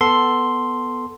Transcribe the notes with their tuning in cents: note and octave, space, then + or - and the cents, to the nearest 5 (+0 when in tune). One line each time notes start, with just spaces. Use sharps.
B3 +0 A4 +0 C6 +0